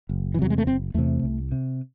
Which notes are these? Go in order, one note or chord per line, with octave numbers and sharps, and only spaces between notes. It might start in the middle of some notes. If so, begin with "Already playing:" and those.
F#1
E3
E2 C3 F#3
G#3
A3
F#1 C4
E2 C3 A3
C2
C3